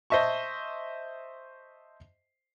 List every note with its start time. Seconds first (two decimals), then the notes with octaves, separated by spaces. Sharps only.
0.10 C5 D#5 E5 A5 C#6